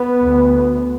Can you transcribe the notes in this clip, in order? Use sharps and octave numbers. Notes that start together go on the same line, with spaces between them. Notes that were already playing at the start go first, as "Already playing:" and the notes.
Already playing: B3
D2